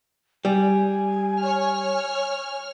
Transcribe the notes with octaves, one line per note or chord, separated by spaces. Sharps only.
G3 G#5
C#5 F6